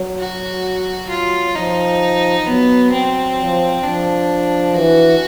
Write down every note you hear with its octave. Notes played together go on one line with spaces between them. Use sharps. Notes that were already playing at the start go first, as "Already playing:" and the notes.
Already playing: F#3
F#4
F4
F#3
F3 D#4
F3
F#3 B3
C4
F3
F3 D4
E3 F#4